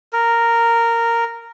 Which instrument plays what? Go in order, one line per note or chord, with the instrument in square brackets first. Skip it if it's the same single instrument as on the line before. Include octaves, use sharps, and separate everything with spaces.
[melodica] A#4